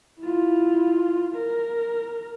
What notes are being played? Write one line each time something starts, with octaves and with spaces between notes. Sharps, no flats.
E4 F4
A#4